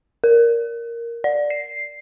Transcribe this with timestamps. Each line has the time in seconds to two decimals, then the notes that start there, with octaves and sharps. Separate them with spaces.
0.24 A#4
1.24 D5
1.50 C7